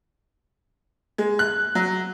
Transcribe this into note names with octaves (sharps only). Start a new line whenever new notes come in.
G#3
F#6
F#3